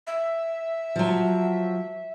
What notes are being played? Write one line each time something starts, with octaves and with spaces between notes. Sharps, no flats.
E5
F3 F#3